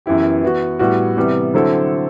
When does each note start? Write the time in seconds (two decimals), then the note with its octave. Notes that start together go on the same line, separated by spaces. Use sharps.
0.06 F#2 E3 B3 E4 G4
0.43 E3 B3 F#4
0.79 A2 G3 B3 F#4
1.17 C3 E3 G3 B3
1.54 D3 F#3 C4 E4 A4